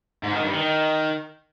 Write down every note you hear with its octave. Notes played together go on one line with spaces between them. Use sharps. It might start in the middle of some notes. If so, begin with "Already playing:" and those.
G#2
D#3
G2
D#3